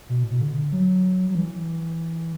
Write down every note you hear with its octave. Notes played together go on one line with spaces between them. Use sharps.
B2
A2
B2
D3
F#3
F#3
E3